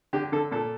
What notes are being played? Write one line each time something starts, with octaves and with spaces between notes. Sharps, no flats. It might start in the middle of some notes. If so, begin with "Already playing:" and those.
D3 G4
D3 A4
A#2 A4